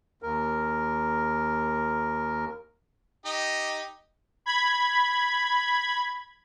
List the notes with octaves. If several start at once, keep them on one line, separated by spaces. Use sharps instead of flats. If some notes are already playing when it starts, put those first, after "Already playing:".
D#2 A#4
D#4 G4 D#5
B5 G#6